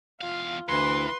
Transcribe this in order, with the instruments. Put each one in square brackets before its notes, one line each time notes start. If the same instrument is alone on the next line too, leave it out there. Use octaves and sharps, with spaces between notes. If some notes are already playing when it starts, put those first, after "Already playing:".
[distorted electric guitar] E2 F5 [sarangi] F4
[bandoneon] D2 [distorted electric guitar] E3 [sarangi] B4 [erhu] C6